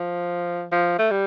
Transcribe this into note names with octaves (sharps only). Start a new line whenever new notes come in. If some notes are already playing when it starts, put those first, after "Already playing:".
Already playing: F3
F3
A3
G3